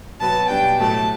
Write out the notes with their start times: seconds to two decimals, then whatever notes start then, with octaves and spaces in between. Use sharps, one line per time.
0.20 B2 F#3 B3 A5
0.49 B2 G3 D4 G5
0.78 A2 F#3 A3 A5